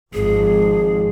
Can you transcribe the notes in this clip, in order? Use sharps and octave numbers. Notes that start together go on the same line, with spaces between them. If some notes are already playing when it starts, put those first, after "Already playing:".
G#1 F3 G#4